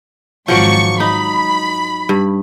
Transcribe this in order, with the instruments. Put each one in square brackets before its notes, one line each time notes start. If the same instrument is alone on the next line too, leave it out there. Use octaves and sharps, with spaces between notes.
[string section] G#1 G#2 C#6 [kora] F3 F#3 D5
[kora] D#4 [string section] B5
[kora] G2